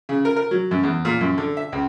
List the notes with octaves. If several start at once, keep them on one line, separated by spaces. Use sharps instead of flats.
C#3
A#4
A#4
F#3
F#2
E2
A#2
F#2
D3
E5
C#2